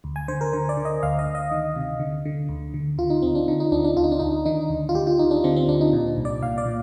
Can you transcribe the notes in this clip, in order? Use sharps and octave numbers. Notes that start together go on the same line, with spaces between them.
D2
G#5
D3 C5
A#4
D3 C5
D5
D3
D#5
D2 F5
D#5
D2
D#5
D#3
C3
D3
D3
D2
D3
D2 F4
D#4
D2 C4
D4
D3 D#4
D#4
D2 D4
D4
D2 F4
D#4
D4
D2 D#4
D#3 D#4
D2
F4
D2 G4
F4
D2 D#4
D4
D3 C4
C4
D2 D4
D#4
A#2
C2
D5
A#2 F5
D5
A#2